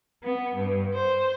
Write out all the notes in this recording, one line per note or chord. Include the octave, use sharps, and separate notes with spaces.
B3
G2
C5